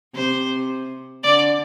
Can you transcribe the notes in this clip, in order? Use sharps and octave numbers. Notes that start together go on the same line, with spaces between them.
C3 C5
D3 D5